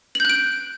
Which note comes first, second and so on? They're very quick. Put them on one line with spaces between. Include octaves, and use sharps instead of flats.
F#7 G6 F#6 D7